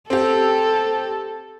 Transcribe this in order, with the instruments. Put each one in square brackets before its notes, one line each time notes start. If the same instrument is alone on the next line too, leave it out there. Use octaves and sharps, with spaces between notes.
[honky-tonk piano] C4 G4 [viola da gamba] A4